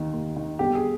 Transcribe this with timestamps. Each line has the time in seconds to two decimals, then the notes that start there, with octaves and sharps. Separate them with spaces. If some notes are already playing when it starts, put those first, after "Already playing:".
Already playing: D#2 D#3
0.13 D#2
0.36 D#3
0.59 G1 G4
0.75 G#4